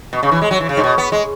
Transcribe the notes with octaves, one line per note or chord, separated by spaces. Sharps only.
B2
C#3
E3
G#3
F#3
E3
C#3
G#2
B2
B3
G#3